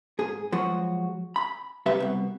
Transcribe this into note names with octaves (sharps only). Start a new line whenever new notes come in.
G#2 G#4
F3 F#3 G#3 F#4
B5
B1 C3 G4 B4 E5
C2 B2